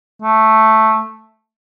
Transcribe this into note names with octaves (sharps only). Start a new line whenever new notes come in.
A3